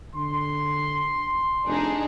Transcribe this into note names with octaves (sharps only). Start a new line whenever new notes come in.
D3 C6
F1 D4 D#4 G#4